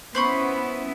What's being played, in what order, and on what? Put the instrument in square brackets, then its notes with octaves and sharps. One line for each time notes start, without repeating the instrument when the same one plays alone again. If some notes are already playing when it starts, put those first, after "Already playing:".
[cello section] B3 C#4 E4 [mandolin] C5 B5 C#6